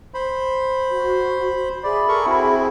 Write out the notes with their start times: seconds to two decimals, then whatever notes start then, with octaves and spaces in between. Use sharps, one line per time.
0.14 C5 B5
0.91 F#4
1.83 G#4 D5 E5 B5
2.08 A4 A#4 C#6
2.26 C4 E4 F#4